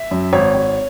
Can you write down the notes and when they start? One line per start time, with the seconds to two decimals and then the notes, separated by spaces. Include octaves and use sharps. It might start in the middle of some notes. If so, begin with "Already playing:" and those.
Already playing: E5
0.11 F#2
0.33 G#1 C#5
0.54 G#1